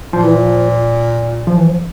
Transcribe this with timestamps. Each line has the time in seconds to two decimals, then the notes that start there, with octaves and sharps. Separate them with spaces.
0.13 A#2 F3
0.23 E3
0.35 F3
1.47 F3
1.57 E3
1.67 F3